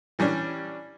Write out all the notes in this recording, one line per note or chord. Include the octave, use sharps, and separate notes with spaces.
E3 G3 C#4 D4